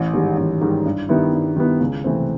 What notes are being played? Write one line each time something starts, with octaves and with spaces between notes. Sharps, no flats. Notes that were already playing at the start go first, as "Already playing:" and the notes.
Already playing: A1
G#2 D#3 G3
A1
G#2 D#3 G3
G2
D#3 G3 B3 E4
G2
D#3 G3 B3 E4
C#2
C3 E3 A3 C4